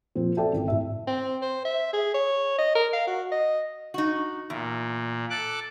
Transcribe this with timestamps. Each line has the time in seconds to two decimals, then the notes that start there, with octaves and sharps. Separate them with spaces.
0.15 A#2 F3 C4
0.37 A4 D5 E5 G5 A5
0.53 G#1 E3
0.68 A2 E5
1.07 C4
1.42 C5
1.65 E5
1.93 G#4
2.14 C#5
2.58 D#5
2.75 A#4
2.93 F5
3.07 F#4
3.32 D#5
3.94 D#4 F#4
4.50 E2 A#2
5.30 A4 D6 F#6